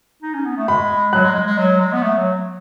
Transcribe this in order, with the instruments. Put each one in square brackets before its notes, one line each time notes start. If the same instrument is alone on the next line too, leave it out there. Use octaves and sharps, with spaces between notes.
[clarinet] D#4
C#4
B3
A3
[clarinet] G#3 [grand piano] B5
[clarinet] F#3 [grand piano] F#6
[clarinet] G#3
G#3
G#3
F#3
G#3
B3
A3
F#3